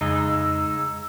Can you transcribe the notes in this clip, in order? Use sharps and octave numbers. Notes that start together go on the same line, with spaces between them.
F2 C#3 G#3 D#4 E6